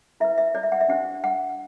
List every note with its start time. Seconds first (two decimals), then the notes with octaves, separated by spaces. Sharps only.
0.20 E4 B4 E5
0.38 E5
0.55 D5
0.63 E5
0.72 F#5
0.81 E5
0.88 D4 G4 C5 F#5
1.24 F#5